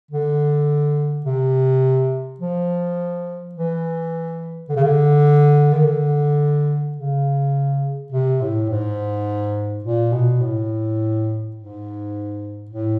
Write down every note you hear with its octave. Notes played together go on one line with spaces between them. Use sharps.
D3
C3
F3
E3
D3
C#3
D3
D#3
D3
C#3
C3
A2
G#2
A#2
B2
A2
G#2
A2